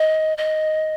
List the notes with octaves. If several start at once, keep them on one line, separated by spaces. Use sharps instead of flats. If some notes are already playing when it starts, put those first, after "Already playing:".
Already playing: D#5
D#5